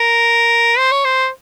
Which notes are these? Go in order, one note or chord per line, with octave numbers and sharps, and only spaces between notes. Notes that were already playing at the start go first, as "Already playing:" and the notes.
Already playing: A#4
C5
C#5
C5